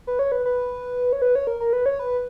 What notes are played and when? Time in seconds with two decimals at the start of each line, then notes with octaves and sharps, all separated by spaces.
0.07 B4
0.19 C#5
0.32 B4
0.46 B4
1.13 C#5
1.22 B4
1.35 C#5
1.47 A#4
1.60 A#4
1.73 B4
1.86 C#5
1.99 B4